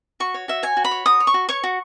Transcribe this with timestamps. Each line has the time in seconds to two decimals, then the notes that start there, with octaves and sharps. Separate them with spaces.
0.20 F#4 C#6
0.34 C#5
0.48 F#4 E5
0.63 C#5 G#5
0.77 F#4
0.84 B5
0.91 C#5
1.06 F#4 D#6
1.20 C#5
1.27 C#6
1.34 F#4
1.49 C#5 C#6
1.64 F#4